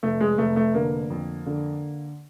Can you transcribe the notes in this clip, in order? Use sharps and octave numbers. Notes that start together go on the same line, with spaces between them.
F1 A3
G#3
F1 A3
A3
D3 A#3
F2
D3